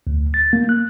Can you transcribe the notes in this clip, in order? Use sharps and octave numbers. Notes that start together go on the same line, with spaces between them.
D2
A6
A#3
F#6